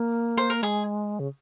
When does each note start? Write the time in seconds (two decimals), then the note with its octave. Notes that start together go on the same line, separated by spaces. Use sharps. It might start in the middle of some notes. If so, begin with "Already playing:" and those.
Already playing: A#3
0.37 C5
0.50 A#4
0.62 G#3 G#4
1.20 C#3